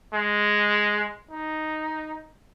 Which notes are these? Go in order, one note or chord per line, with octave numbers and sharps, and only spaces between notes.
G#3
D#4